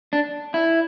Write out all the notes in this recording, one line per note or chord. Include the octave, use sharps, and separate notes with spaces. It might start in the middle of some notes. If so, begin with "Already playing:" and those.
D4
E4